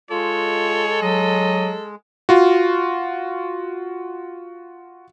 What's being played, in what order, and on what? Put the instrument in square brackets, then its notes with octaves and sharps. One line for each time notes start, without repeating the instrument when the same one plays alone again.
[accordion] G#3 [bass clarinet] F4 [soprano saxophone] A4 [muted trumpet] C#5
[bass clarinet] F#3 [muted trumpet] D#5
[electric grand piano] F4 F#4